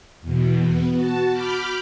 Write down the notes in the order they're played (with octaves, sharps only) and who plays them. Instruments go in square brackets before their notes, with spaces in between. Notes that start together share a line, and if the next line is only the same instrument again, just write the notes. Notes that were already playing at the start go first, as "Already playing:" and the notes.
[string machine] E2 B2
B3
F#4 A5
B5 D6 F6 G6